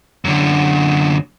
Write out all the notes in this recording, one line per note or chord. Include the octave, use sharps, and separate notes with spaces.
F#2 D3